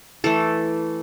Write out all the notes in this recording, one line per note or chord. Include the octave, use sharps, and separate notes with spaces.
E3 A3 A4